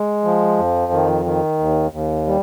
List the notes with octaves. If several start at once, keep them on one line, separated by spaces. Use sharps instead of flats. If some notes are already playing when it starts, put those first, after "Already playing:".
Already playing: G#3
F3
F2
D#3
D#3
D#2
D#2
G3